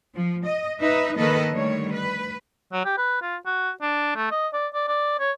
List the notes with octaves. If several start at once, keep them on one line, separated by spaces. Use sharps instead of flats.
F3
D#5
D#4 B4 E5
D#3 A#3 A4 B4 D#5
D3 D#3 G3 A3 C#5
B4
F#3
G4
B4
F4
F#4
D4
A3
D#5
D5
D5
D5
C#5